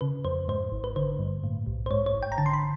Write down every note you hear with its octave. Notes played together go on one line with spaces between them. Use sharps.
C#3 B4
F2 C5
G#2 C5
G#1
B4
D3 C5
G2
A2
B1
C5
G#2 C#5
C#5
G#1
G5
A#5
D3 A5
C6
B5